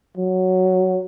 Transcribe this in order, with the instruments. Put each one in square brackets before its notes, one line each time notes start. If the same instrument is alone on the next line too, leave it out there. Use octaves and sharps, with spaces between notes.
[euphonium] F#3